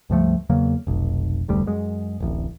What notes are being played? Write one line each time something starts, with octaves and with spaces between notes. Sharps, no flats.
C#2 G2 F3 A3
E2 C#3 F#3 A#3
F1 B1
F1 D2 G3
F#2 G#3
D1 A1